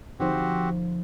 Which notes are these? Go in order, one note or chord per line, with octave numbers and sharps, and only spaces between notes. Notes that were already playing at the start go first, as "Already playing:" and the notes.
D3 F3 C4 D#4 F#4 G4 C5